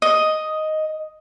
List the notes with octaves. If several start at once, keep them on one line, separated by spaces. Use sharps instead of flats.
D#5